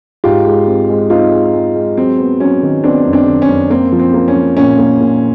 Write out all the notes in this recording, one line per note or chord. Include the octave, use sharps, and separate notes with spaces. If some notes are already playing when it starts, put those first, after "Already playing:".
G#2 F4 G4
G#3
C4
G#3
C4 D#4 F4
G#3
G#3
G#3
F#3 C4
B3
F#3 C#4
D#3
B3 C4 D4
F#2
C4 D4
D#3
C#4
F#2
A#3 C4
F3
C4
A#3
C#4
F3
A#2 C#4
A#3
A#2